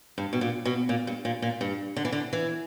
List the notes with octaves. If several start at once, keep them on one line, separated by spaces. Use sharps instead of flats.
G2
B2
A#2
B2
A#2
G2
A#2
A#2
G2
D3
E3
D3
E3